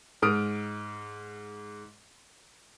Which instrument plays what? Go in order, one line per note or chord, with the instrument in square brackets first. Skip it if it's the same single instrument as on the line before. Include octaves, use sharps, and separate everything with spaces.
[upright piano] G#2 D#6 F6 D7